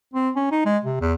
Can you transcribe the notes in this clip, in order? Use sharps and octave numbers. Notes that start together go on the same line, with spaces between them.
C4
C#4
D#4
G#3
C3
E2